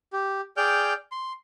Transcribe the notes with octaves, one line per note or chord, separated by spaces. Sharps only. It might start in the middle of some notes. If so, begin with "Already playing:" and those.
G4
G#4 D5 G5 F6 G6
C6